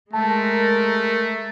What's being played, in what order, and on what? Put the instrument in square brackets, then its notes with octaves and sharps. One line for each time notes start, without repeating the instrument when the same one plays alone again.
[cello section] G#3 A#4 [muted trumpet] A3 [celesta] A5